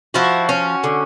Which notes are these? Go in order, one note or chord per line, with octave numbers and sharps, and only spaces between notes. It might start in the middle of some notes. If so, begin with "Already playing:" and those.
F3 E4 F#4
C#4
D3